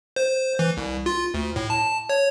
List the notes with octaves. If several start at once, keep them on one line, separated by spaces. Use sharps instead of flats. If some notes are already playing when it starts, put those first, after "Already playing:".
C5
E3
C2
F4
D2
A2
A5
C#5